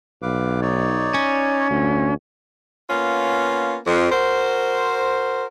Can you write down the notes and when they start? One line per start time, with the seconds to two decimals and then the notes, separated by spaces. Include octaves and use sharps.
0.22 B1 B4 F5 D6
0.62 D#4 C#5 D5
1.14 C#4
1.70 D2
2.90 A#3 B3 C#4 F4
3.87 F2
4.12 F#4 A#4 C5